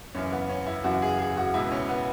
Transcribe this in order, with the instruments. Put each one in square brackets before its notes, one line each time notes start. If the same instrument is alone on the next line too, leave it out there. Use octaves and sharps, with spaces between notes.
[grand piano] F#2 C#3 E3 C#4
B3
C#4
E4
F#2 C#3 E3 F#4
G#4
G#4
F#4
C#2 B2 E4
C#4
B3